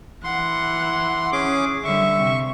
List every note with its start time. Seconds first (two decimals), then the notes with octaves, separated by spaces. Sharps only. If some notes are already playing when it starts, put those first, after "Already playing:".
0.24 E3 F#5 C6
1.32 C#4 G#4 D6
1.85 D3 G3 E5 C#6
2.19 C3